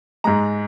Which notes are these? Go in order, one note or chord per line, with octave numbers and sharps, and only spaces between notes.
G#2 G#3 A#5